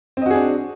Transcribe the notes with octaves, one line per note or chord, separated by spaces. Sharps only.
C4 D4 F#4 G#4 D#5